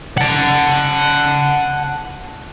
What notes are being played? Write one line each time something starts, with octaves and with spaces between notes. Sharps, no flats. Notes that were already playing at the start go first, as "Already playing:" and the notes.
F#5 A5